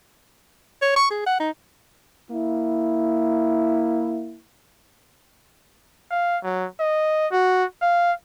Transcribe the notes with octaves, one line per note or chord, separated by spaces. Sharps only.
C#5
C#6
G#4
F#5
D#4
A#3 E4
F5
F#3
D#5
F#4
F5